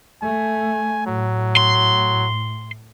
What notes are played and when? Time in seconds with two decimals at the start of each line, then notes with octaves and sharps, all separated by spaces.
0.22 A3 G#5
1.06 A2 F#3
1.57 C6